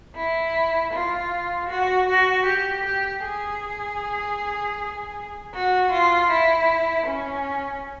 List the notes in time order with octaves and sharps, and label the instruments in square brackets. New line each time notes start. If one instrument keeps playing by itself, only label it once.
[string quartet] E4
F4
F#4
F#4
G4
G4
G#4
F#4
F4
E4
C#4